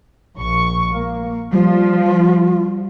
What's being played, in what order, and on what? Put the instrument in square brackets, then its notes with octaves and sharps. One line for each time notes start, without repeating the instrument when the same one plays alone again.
[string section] A#1 C#6
A#3
[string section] F3 [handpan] G3 [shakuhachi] F4